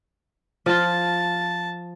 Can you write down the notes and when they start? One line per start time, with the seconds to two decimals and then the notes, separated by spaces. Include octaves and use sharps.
0.66 F3 F4 A5